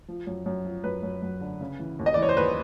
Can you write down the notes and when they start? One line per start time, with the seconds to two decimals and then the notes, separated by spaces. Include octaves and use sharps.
0.08 F3
0.27 F#2
0.46 F#2
0.65 F3
0.84 F#2 B4
1.03 F#2
1.22 F#2
1.41 D3
1.61 C#3
1.79 E3
1.99 D#2
2.06 D#5
2.14 D5
2.17 E3
2.22 C#5
2.29 C5
2.37 D#2 B4